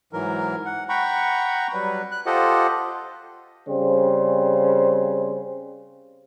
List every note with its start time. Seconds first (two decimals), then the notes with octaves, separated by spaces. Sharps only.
0.13 G#2 E3 F#3 A#4
0.66 F#5
0.89 F#5 G5 A#5 B5 C#6
1.73 F#3 G3 B4
2.11 F#6
2.26 F4 G4 A4 C5 D#5 F#5
3.68 C#3 G3 C4 C5